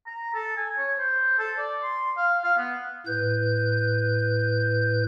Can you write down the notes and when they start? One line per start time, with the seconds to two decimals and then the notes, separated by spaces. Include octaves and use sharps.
0.06 A#5
0.34 A4
0.57 G#5
0.78 C#5
0.98 C5
1.39 A4
1.58 D5
1.83 C6
2.17 F5
2.44 F5
2.57 B3
3.07 A2 B4 G6